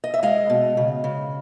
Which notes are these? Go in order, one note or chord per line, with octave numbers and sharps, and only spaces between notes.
D#5
E5
G#3 D#5 F5
B2
C#3
C#3